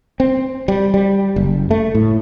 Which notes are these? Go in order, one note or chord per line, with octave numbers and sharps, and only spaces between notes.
C4
G3
G3
F#1
A3
A2